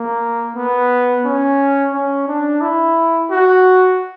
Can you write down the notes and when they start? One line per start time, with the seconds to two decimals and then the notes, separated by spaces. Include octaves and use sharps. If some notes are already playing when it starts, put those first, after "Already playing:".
Already playing: A#3
0.56 B3
1.25 C#4
1.94 C#4
2.28 D4
2.61 E4
3.31 F#4